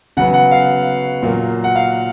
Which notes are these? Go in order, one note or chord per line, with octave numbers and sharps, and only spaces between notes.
C#3 F#3 B3 F#5
F#5
F5
A#2 F#3 A#3
F#5
F5